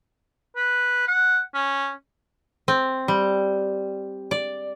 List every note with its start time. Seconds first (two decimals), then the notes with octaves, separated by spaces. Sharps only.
0.56 B4
1.08 F#5
1.55 C#4
2.68 C4
3.08 G3
4.31 D5